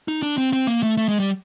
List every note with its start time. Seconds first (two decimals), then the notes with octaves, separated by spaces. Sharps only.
0.08 D#4
0.22 D4
0.38 C4
0.53 C4
0.67 A#3
0.83 A3
0.97 A3
1.08 G#3
1.20 G3